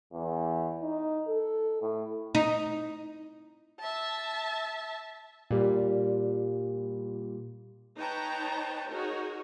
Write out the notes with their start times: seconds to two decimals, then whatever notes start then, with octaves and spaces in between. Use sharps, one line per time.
0.13 E2
0.83 D#4
1.28 A4
1.82 A2
2.35 D#4
3.80 E5 A5
5.51 A#2 G3
7.97 D#4 B4 C#5 G5 A5 A#5
8.90 D#4 F#4 G#4 A#4 C#5